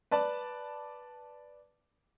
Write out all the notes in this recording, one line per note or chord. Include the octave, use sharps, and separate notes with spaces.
B4 D5 A5